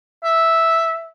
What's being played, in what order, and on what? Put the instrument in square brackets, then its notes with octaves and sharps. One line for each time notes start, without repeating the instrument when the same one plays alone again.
[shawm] E5